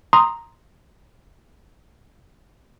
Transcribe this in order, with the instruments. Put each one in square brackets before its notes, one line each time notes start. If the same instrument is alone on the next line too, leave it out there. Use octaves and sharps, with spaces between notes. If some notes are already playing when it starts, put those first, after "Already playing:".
[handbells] A#5 C6 D#6